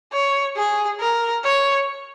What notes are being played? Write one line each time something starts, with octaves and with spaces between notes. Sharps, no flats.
C#5
G#4
A#4
C#5